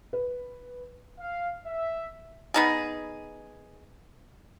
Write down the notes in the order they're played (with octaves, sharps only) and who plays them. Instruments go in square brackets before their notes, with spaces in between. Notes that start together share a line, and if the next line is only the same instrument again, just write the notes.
[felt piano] B4
[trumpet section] F5
E5
[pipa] B3 D#4 G#4